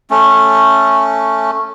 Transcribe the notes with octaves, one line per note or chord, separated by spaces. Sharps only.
A3 C#4